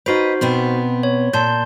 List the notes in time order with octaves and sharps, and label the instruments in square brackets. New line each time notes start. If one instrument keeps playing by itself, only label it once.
[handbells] D#4 F#4 C5 [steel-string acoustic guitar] B4 D#5
[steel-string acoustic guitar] B2 B3 C4
[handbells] C#5
[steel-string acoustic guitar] A#2 [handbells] A5 C6 G6